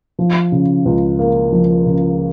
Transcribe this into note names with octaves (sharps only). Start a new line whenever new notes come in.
F3
C#3
C#2
A#3
F3
C#3